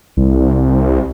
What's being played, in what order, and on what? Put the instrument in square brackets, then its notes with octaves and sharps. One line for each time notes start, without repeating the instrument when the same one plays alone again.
[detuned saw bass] C2